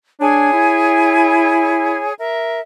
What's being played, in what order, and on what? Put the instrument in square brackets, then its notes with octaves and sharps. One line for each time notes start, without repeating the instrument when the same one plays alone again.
[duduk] D4 [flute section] G#4 C#5 G#5
[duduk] E4
[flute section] A#4 E5